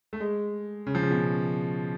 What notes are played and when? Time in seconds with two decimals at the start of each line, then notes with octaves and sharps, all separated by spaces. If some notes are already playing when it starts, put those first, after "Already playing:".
0.13 A3
0.20 G#3
0.86 C#3
0.95 F3
1.03 C#3
1.11 B2